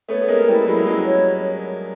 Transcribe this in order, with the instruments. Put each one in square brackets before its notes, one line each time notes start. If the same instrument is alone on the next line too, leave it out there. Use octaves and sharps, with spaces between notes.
[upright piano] A3 B3 [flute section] C#5
[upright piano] B3
[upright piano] G#3 A#3 [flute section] A#4
[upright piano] G3 A3 [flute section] E4
[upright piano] F#3 G#3 [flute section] E4
[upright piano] F#3 G#3 [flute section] E4
[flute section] C#5